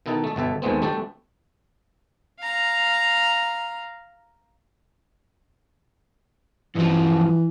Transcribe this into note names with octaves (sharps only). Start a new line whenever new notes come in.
B2 D#3 D#4 E4 A4
A3 A4
G1 B2 A4 E5
D#2 A#2 G#3 A3 B3 C4
G3 A3 D4 A4 D5 G5
F5 A#5
G2 E3 F3